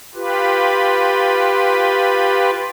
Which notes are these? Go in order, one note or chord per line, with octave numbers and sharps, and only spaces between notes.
F4 G4 B4